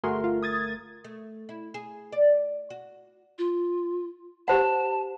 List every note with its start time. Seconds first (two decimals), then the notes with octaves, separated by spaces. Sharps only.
0.04 G1 A3 F#4 G#4 A#4 C6
0.24 F4
0.43 D#6 G#6 A6
1.04 A3
1.49 E4
1.74 G#4
2.12 D5
2.70 F#4
3.38 F4
4.48 G4 C5 F#5 A5